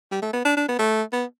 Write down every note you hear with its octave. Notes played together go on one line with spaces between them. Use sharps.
G3
A3
B3
D4
D4
B3
A3
B3